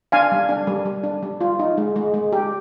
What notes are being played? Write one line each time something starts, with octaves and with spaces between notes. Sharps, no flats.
D4 F5 G#5
G3
D4
G3
G3
D4
G3
F4
D#4
G#3
G#3
G#3
G4